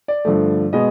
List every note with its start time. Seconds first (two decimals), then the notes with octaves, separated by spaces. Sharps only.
0.08 D5
0.25 G2 D3 F3 A3
0.73 B2 G#3 B3 D#5